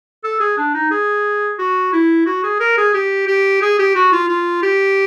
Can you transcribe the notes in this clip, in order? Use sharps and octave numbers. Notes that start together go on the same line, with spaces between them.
A4
G#4
D4
D#4
G#4
F#4
E4
F#4
G#4
A#4
G#4
G4
G4
G#4
G4
F#4
F4
F4
G4